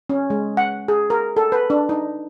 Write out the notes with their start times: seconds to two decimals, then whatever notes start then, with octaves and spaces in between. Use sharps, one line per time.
0.10 C#4
0.30 G#3
0.57 F#5
0.88 G#4
1.10 A#4
1.37 A4
1.52 B4
1.70 D4
1.89 D#4